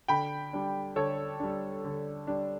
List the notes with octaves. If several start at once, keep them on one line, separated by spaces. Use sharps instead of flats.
D3 G5 B5
G3 D4
D3 A4 C#5
G3 D4
D3
G3 D4